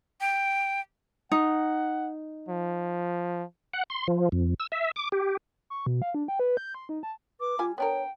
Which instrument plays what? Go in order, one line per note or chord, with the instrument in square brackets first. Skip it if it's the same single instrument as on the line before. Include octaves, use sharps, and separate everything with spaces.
[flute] G5
[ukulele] D#4 [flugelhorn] F#5
[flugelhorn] F3
[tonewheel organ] F#5
C6
F3
F2
E6
E5
D6
G4
[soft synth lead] C#6
B2
F5
D4
G5
B4
G6
C6
D#4
A5
[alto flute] B4 [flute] D6
[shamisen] G3 G#5 [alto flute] F4
[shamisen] B3 D4 A#4 [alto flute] C#5 [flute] G5